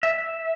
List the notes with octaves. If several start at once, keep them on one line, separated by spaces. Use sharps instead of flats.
E5